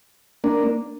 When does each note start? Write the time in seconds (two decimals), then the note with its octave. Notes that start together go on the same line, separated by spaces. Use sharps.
0.44 A#3 D4